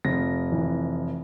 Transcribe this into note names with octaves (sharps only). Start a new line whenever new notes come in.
F1 A#6
E3